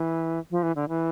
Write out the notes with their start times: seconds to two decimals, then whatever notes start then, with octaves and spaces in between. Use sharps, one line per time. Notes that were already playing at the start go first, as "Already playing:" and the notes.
Already playing: E3
0.51 F3
0.63 E3
0.76 D3
0.89 E3